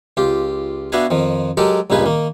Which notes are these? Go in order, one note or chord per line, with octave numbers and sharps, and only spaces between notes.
C#2 F4 G4
B3 D4 F#4 E5 F5 G#5
F2 D#3 F3
F#3 G#3 G4 A4 A#4 D#5
C#2 G2 A#2 D#4 G#4 B4
D#3 A#3